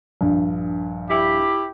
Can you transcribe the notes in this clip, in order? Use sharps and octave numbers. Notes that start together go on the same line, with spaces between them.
A#1 G2
E4 G4